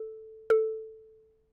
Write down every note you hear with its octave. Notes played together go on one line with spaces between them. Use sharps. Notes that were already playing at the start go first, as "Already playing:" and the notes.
Already playing: A4
A4